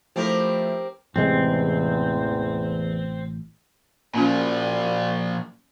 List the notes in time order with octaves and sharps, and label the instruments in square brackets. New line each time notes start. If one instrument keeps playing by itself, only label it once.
[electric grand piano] F3 A3 E4 [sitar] C4 G4 A#4
[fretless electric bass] A1 C3 G#3 [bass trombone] E2 [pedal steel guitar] C4
[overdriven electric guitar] A#2 F3 [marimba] A#3 C#4 F4 [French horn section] F#4 A#4 D5